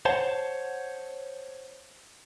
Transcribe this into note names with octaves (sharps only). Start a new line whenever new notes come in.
C5 C#5 F#5 A5